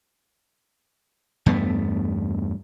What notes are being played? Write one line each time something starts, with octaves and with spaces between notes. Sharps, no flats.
E2 G2 A3 B3